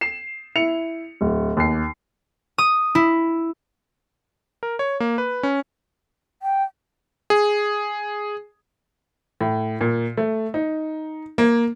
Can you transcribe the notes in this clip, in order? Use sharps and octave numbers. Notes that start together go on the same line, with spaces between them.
C7 E7
E4 C#7 F7
D1
D#2 C7
D#6
E4
A#4
C#5
A#3
B4
C#4
G5
G#4
A2
A#2
A3
D#4
A#3